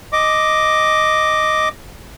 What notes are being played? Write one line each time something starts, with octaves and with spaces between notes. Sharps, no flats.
D#5 D6